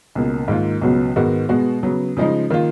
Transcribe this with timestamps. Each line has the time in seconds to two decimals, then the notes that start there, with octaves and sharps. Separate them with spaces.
0.15 C#2 B2 A#3
0.48 G#2 D#3 A#3 F4
0.82 C#2 B2 F#3 B3 F#4
1.16 G#2 D#3 G#3 B3 F#4
1.49 B2 G#3 B3 F#4
1.83 C#3 F#3 B3
2.17 C#3 F3 G#3 D#4
2.50 D#3 A#3 F4